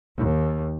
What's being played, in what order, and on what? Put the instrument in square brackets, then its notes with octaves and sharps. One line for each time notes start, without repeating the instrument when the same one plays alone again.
[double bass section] D#2